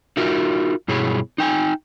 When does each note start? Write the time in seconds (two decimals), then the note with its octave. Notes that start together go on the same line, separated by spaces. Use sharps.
0.17 D#4 F4 F#4 A#4 E5
0.88 G2 B2 E4 G#4 C#5
1.38 D#4 G5 G#5